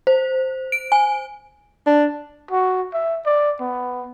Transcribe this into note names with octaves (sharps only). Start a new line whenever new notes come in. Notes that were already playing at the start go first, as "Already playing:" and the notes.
C5
D7
G#5
D4
F#4
E5
D5
B3